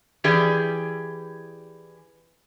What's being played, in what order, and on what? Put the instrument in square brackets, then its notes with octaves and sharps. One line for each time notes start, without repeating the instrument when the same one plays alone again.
[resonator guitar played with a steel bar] E3 G4 G#4 D5